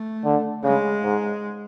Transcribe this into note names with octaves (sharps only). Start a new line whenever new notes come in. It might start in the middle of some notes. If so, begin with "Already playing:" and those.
Already playing: A3
D3
C#3 G#3
G#2